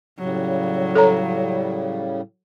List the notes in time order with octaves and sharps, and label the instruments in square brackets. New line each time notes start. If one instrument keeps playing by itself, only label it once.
[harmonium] A2 C#3 G3 [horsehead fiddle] F#3
[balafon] A4 C#5 A#5